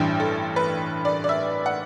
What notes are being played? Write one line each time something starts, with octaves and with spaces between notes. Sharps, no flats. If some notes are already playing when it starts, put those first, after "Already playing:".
Already playing: A1 G2 E3 G3 G5
A4
B4
D5
D5
E5
F#5